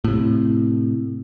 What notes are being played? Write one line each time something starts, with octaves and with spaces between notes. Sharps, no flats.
A2 C3